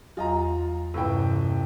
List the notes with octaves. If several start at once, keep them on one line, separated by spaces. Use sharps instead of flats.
E2 F#3 F4 D#5 A#5
D#1 G2 C3 E3 G5 C#6